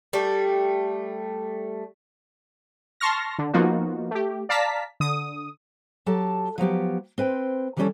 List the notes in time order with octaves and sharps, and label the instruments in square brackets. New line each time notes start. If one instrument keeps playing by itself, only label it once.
[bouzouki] G3 A3
[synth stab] A5 C6 C#6 F6 A#6
D3
F3 A#3 B3 D#4 F4 F#4
A3 G4
D5 F5 A5 A#5 B6
D3 D#6
[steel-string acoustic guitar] F#3 G4 A4 A5
F3 F#3 B3 G4
C4 B4 C5 G5
D#3 E3 G3 A#3 C#4 A4